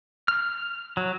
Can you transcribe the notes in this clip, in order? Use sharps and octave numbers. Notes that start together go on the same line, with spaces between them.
F6
F#3